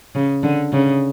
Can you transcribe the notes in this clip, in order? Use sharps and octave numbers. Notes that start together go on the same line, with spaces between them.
C#3
D3
C#3